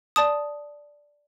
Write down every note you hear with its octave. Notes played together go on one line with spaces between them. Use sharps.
D5 A5 D#6